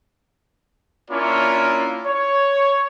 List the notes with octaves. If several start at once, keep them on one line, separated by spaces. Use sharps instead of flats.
A#3 C#4 D4 E4 F4 C#5
C#5